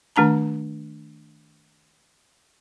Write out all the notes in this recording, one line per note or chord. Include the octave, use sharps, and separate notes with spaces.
D#3 A3 D4 A5 A#5